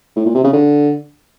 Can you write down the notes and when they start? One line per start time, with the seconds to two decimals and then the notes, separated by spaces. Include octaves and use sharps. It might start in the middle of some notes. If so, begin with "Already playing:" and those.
0.16 A2
0.26 A#2
0.35 C3
0.44 C#3
0.53 D3